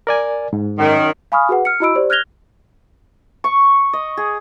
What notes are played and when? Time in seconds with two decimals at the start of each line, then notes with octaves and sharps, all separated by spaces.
0.07 A#4 D5 G#5
0.53 G#2
0.78 F#2 D#3
1.32 F5 G#5 B5 C#6 D#6 F6
1.49 F#4 G#4 B4 F#5
1.65 F6 C#7
1.80 E4 F#4 D#5 B5 E6 D7
1.95 G4 C5 D5
2.10 F6 F#6 G#6 A#6 F7 G7
3.44 C#6
3.93 D#5
4.17 G#4